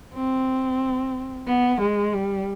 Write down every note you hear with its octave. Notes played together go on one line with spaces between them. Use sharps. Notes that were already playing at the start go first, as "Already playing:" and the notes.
C4
B3
G#3
G3